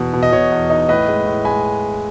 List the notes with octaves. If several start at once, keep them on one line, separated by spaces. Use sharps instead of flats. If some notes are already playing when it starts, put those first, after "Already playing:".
Already playing: E2 B2
B2
D#5
B2 C#5
E2
D#4
A2 B4 D#5
G#3
A2
G#3 G#5 B5